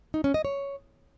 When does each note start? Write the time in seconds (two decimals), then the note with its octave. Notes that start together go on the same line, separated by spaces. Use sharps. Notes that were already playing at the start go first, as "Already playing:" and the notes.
0.14 D#4
0.24 C#4
0.34 D#5
0.45 C#5